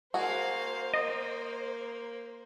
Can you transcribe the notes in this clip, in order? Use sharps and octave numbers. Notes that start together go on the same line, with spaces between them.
A#3 F#4 G#4 C5 F5
A#3 D#5